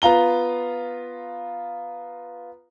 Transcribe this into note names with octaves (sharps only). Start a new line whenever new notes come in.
B3 F4 A#5 G7